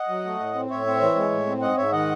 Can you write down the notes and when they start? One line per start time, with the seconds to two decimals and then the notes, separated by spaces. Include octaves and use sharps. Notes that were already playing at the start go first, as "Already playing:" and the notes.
Already playing: D#5 F#5
0.09 F#3
0.25 A3
0.40 A2
0.55 C4
0.70 A2 C#5 E5
0.86 C4
1.01 E3
1.16 G#3
1.31 A2
1.46 C4
1.61 G#2 D#5 F#5
1.77 G#2 C#5 E5
1.92 D#3 D#5 F#5